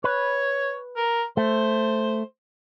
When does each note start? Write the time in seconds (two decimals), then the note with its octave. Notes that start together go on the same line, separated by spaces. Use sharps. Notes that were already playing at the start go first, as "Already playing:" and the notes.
0.04 B4 C#5
0.97 A#4
1.37 A3 C5